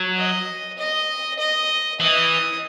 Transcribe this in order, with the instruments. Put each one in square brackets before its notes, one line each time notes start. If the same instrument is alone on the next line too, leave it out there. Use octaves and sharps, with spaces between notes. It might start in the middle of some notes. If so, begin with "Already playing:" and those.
Already playing: [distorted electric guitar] F#3
[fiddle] D#5
D#5
D#5
[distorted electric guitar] E3 [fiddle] D#5